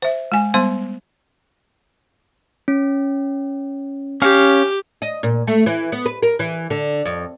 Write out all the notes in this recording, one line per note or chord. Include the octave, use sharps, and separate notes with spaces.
C5 E5
G#3 G#5
G3 B3 C5 C6
C#4
C#4 G4 F5
D#5
A#2
A3
E3
B3
B4
A#4
E3
D3
F2